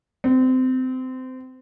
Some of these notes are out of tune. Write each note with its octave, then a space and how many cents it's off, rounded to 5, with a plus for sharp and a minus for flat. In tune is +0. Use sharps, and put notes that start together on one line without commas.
C4 -25